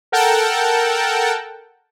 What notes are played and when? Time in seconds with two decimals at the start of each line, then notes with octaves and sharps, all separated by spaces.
0.12 A4 A#4 F#5 G5 A5